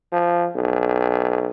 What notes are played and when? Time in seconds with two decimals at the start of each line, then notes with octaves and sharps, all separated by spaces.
0.12 F3
0.56 B1